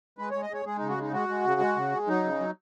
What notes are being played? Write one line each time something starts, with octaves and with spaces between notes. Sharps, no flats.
G#3 B4
G#3 C#5
D#5
G#3 C#5
G#3 G#4
C#3 D#4
F#4
G#3 D#4
G#3 F#4
G#3
C#3
G#3
C#3
G#3
F#3 D#4
C#3
F#3